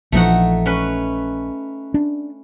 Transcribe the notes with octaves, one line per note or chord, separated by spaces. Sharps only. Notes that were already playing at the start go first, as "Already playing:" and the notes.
A#1 E3 F3 A3 D#4 F#5
C#4 B4
D4